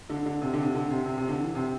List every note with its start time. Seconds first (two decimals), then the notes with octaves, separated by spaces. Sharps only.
0.09 D3
0.26 D3
0.42 C3
0.53 D3
0.63 C3
0.75 D3
0.91 C3
1.06 C3
1.18 C3
1.29 D3
1.40 E3
1.55 C3